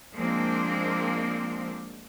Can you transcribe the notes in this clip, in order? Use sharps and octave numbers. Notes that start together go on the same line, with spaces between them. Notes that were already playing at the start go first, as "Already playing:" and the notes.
F3 G#3 A#3 C4 D4